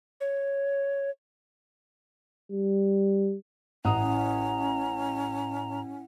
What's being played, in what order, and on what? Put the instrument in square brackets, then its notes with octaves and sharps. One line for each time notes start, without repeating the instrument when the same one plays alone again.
[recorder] C#5
[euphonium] G3
[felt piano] A1 D#6 [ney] C#4 [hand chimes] E4 F#5 [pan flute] A#5